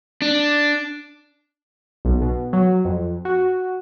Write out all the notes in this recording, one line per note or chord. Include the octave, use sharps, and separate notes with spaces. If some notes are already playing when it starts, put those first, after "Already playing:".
D4
B1
B2
F#3
F2
F#4